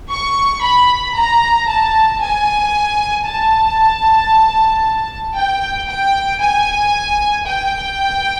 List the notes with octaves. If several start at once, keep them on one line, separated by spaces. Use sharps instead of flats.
C#6
B5
A#5
A5
G#5
A5
G5
G5
G#5
G5